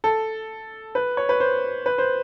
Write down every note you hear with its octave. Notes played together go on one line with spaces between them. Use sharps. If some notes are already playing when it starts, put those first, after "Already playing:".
A4
B4
C#5
B4
C5
B4
C5